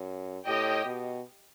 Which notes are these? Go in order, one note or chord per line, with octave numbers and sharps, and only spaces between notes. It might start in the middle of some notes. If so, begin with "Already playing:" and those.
Already playing: F#2
A2 G4 D#5 G5
B2